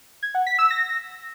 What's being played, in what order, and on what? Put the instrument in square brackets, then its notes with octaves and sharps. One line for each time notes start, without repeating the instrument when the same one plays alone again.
[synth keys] G#6
F#5
B6
E6
A#6